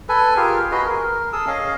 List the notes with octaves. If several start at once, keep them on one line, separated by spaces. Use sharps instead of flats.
A4 B4 G#5
F4 G4 G#4 A#4
F#4 G#4 B4 D#5
A#4
G#4 A4 D#6 E6
C#4 G#4 D#5 F5